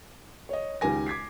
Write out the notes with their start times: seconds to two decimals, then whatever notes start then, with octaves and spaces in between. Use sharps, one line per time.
0.49 C#5 D#5
0.81 C#2 D#3 G4 A#4 G#5 A#6
1.06 D6 G#6 B6 C7